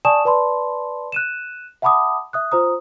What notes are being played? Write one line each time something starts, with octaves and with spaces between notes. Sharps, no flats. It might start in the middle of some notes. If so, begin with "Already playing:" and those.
D5 G#5 A5 C#6 D#6 E7
B4 D5 A5 B5 C6
F#6 D#7 E7
E5 F#5 A5 B5 D6 D#6
E5 D#6 F#6
F4 C5 A#5 D#6